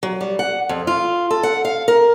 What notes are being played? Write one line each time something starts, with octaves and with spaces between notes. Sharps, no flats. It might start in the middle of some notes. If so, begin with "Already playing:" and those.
F#3
G3
F#5
F2
F4
A4
F#5
F5
A#4